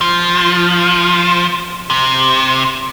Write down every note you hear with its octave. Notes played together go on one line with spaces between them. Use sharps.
F3
C3